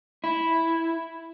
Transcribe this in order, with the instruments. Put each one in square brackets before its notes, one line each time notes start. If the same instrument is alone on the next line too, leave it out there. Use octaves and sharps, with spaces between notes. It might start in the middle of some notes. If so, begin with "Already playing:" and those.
[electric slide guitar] E4